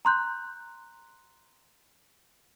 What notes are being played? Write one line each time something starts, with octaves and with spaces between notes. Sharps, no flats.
A#5 C6 F#6 G6